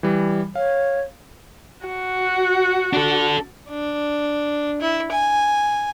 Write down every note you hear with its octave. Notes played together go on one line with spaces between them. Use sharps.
E3 G3
C#5 F5
F#4
D4 A4
D4
E4
G#5